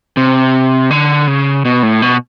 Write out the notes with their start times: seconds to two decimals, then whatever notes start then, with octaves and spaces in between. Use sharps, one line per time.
0.17 C3
0.91 D3
1.27 C#3
1.65 B2
1.83 A2
2.02 B2